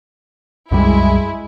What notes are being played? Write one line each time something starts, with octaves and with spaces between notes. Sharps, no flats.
C2 F#2 G3 G#3 E4